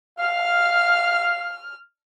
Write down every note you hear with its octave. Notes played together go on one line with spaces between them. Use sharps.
F5 F6